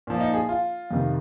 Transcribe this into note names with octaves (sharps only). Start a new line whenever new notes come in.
A#2 F3
D#4
G#4
F4
F2 C3 D#3